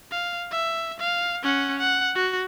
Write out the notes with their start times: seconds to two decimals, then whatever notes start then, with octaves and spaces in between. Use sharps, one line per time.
0.11 F5
0.52 E5
0.99 F5
1.43 C#4 F#5
1.79 F#5
2.15 F#4